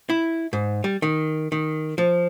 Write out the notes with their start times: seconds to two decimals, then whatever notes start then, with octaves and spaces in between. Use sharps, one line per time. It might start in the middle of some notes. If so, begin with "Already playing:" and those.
0.10 E4
0.53 G#2
0.84 G3
1.02 D#3
1.52 D#3
1.98 F3